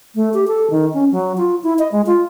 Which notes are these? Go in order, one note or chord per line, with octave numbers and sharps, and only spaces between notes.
A3
G4
A4
D#3
C#4
F#3
F4
E4
D#5
G#3
F4